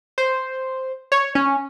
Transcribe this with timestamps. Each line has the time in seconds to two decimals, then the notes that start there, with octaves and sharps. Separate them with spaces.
0.18 C5
1.12 C#5
1.35 C#4